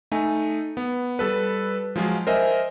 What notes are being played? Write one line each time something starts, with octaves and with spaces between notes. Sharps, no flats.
A3 D#4 G#5
B3
G3 A4 B4
F3 F#3 G#3 F4
A#4 C5 D#5 E5 G#5